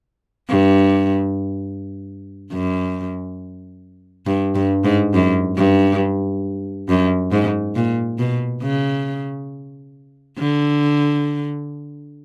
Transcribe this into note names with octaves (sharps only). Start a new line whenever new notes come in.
G2
F#2
G2
G2
G#2
F#2
G2
F#2
G#2
A#2
B2
C#3
D3